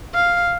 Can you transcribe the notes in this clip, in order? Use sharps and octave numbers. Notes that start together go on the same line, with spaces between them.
F5